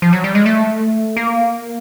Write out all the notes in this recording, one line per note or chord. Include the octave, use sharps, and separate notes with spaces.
F3
F#3
G3
G#3
A3
A#3